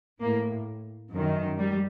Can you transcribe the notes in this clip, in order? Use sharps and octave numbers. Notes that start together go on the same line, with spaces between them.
A2 A#3
F#2 D#3
G3